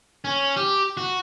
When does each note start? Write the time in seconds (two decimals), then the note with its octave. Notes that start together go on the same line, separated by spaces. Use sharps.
0.25 C#4
0.57 G4
0.97 F#4